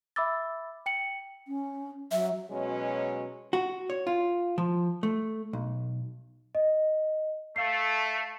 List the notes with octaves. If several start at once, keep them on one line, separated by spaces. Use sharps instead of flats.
E5 B5 D6 E6 A6
G5 C#7 F#7
C#4
F#3 E5
B2 F#3 G#3 C#4
F#4
C#5
F4
F3
A3
B1
D#5
A3 F5 C7